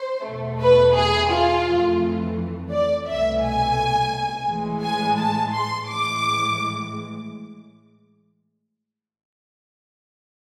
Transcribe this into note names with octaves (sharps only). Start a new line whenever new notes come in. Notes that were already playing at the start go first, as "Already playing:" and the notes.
Already playing: C5
E2 B2 A3
B4
G#4
F4
F2 E3 A3
D5
C2 B2 A3 E5
G#5
A2 E3 G#3
G#5
A5
C6
A2 E3 G#3 D6